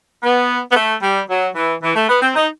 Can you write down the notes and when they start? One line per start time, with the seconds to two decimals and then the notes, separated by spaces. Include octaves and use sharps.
0.23 B3
0.72 B3
0.76 A3
1.02 G3
1.29 F#3
1.55 E3
1.83 E3
1.96 A3
2.09 B3
2.22 C4
2.35 D#4